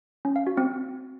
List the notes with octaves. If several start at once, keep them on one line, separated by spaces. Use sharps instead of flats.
C#4
F5
F#4
C4